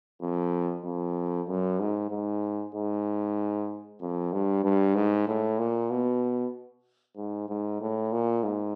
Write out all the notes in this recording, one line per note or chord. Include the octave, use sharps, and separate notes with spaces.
F2
F2
F#2
G#2
G#2
G#2
F2
G2
G2
G#2
A2
A#2
B2
G#2
G#2
A2
A#2
G#2